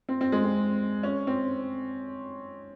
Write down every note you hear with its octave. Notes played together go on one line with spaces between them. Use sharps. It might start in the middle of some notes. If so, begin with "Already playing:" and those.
C4
C4
G#3
C4
C#4
C4